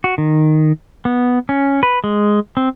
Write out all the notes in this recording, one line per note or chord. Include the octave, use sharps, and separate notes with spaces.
F#4
D#3
B3
C#4
B4
G#3
C4